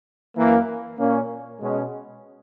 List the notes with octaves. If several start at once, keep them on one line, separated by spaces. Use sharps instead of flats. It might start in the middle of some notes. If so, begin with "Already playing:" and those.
F#2 E3 A#3
A#2 A#3 C#4
B2 G#3 C#4